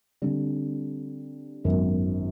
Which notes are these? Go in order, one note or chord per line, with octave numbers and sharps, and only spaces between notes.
D3 G3 C4
G#1 F#2 D#3 F#3 B3